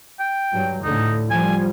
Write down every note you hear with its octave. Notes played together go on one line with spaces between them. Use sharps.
G5
G2 F#3
D2 A2 D3 D#4
F3 G3 G#5